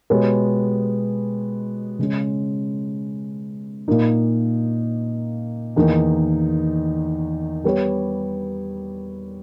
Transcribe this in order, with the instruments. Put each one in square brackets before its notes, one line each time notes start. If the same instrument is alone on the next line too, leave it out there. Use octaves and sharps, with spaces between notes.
[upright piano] B2 G#3 B3 G4 C#5
C#3 G#3 C#4
A#2 A#3 D#4 A#4
E2 D#3 A#3 D#4
G3 B3 G4 C#5